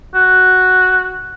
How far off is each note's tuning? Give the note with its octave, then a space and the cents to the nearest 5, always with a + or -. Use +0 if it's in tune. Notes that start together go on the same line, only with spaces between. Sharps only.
F#4 +0